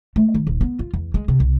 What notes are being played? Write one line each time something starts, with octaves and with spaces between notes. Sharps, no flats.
A3
D#3
D#1
B3
F4
E2
G#3
C3
C2